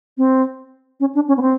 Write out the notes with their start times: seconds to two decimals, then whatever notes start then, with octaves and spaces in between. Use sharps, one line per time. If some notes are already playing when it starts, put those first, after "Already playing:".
0.18 C4
1.00 C#4
1.15 D4
1.28 C#4
1.37 B3
1.41 C4